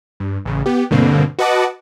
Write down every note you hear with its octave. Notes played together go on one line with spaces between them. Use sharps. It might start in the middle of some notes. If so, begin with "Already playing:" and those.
G2
A1 C#3
B3 G4
D2 G2 B2 D3 A#3 C4
F#4 B4 D#5 F#5 A5 D6